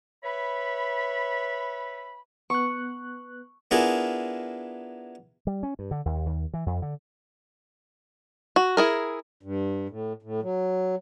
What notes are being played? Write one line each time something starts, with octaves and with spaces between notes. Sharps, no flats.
B4 C#5 E5 B5
B3 C#6 F#6
B3 D4 E4 F4 G#4 A#4
G3
C#4
G2
D3
D#2
D#2
E3
F2
D3
F#4
E4 G#4 A#4
G2
A2
A2
F#3